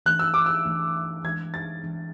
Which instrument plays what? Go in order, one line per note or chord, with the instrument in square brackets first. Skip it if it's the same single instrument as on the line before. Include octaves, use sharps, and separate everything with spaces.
[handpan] E3 A3 D4 [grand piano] F#6
[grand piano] E6
D6
E6
[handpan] E3 A3 D4
[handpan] E3 G#3 D4 [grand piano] G#6
[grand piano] A6
[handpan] E3 G#3 D4